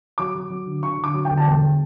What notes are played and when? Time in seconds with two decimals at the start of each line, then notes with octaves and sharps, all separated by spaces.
0.18 F#3 D6
0.35 F#3
0.50 F#3
0.66 D3
0.82 D3 C#6
0.98 D3
1.04 D6
1.14 F#3
1.25 G5
1.30 G1
1.37 A5
1.47 E1 G5